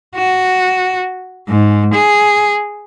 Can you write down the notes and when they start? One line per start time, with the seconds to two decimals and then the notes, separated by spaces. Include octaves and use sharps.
0.16 F#4
1.49 G#2
1.94 G#4